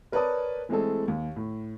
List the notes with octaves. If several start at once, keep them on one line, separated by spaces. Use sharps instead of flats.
A#4 B4 C#5 D5 A5 D#6
E3 G#3 A3 C4 G#4 A4
D#2
A2